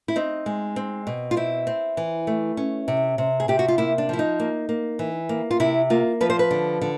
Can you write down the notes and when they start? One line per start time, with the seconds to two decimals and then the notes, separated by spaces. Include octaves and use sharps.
0.08 E4
0.16 C4 D#4
0.46 G#3
0.76 C4
1.07 B2
1.31 F4
1.37 C4 E4
1.67 C4
1.97 E3
2.27 A3
2.57 C#4
2.88 C3
3.18 C3
3.40 G#4
3.48 C3 G4
3.59 F#4
3.68 F4
3.78 A#3 E4
3.98 D4
4.09 F3 E4
4.19 D#4
4.40 A#3
4.69 A#3
4.99 E3
5.29 A#3
5.51 F4
5.60 C3 E4
5.90 A#3 F4
6.21 F3 B4
6.30 C5
6.39 B4
6.51 D3
6.81 D3